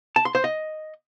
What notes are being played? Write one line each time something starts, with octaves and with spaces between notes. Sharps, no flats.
A5
C6
C5
D#5